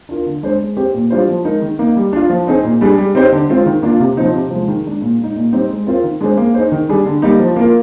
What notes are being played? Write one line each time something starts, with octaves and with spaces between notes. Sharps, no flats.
D4 F4 A#4
D3
G#3 D4 G#4 C5
G#3
C4 G4 C5
A#2
G3 D4 F4 C5
F3
G#3 D#4 A#4
D#3
A#3 D#4
G3
D4 F4
F3
C4 D#4 G#4
A#2
G3 D4 G#4
G3
C4 D#4 G4 C5
D3
G#3 C4 F4
D#3
A#3 D4 F4
C3
F3 C4 D#4
C3
F3 G#3
D#3
G#3 D4
A#2
G#3
D#4
A#2
G3 C4 D#4
G#3
C4 F4 A#4
D#3
G#3 D4 G#4 C5
A#3
D#4 G#4 C5
D#3
G3 D4 G#4
D3
G3 A#3 D#4
F3
A#3 F4 A#4